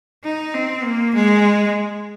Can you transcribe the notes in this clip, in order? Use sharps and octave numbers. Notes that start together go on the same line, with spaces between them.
D#4
C4
A#3
G#3